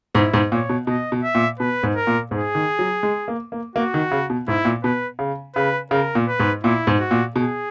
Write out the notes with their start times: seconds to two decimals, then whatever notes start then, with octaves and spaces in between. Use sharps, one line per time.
0.15 G#2 E4
0.34 G#2
0.52 A#2 C#5
0.69 B2
0.87 B2 D#5
1.12 B2
1.23 E5
1.35 A#2
1.59 B2 B4
1.83 G#2
1.95 A#4
2.07 A#2
2.31 G#2 G#4
2.55 D#3
2.79 F#3
3.03 G#3
3.28 A#3
3.52 A#3
3.76 A#3 F#4
3.94 D#3
4.11 C#3
4.30 B2
4.48 G#2 E4
4.65 A#2
4.83 B2 B4
5.19 C#3
5.55 C#3 B4
5.91 C#3 A#4
6.15 A#2
6.27 B4
6.40 G#2
6.63 A#2 E4
6.87 G#2
6.99 F#4
7.11 A#2
7.35 B2 G#4